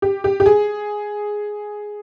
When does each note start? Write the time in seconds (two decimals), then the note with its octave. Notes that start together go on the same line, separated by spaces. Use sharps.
0.02 G4
0.24 G4
0.40 G4
0.46 G#4